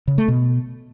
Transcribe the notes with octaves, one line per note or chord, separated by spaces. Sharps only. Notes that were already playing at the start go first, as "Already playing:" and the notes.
C#3
A3
B2